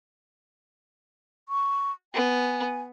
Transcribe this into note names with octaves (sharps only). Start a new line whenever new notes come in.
C#6
B3 G#5